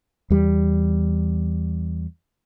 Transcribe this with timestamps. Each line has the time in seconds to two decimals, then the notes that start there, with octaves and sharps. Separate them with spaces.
0.30 E2 G3